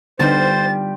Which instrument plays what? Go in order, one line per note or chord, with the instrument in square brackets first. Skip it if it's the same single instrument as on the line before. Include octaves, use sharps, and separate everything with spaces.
[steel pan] D3 B3 D#4 [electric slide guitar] G3 F4 G4 [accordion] C5 [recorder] A6